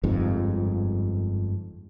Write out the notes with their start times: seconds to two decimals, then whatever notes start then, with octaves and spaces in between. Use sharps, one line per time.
0.03 G1 F2 G#2